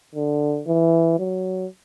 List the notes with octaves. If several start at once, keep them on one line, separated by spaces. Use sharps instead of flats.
D3
E3
F#3